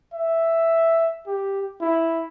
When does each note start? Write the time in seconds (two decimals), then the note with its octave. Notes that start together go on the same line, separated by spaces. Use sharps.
0.14 E5
1.27 G4
1.81 E4